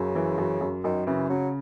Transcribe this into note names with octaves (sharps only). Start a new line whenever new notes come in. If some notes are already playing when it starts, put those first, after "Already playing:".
Already playing: F#2 C#3
E3
F#2
F#2
F#2 D#3
C#3 E3
C#3 F#3